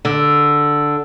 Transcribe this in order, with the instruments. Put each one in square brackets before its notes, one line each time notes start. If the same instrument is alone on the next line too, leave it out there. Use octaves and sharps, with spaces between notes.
[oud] D3